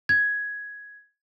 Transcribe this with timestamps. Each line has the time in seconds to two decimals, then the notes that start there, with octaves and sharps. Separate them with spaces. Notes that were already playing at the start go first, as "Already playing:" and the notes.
0.09 G#6